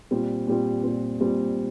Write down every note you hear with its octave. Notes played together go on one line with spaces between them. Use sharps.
A#2 G3 C4
A#2 G3 C4
A#2 G3 C4
A#2 G3 C4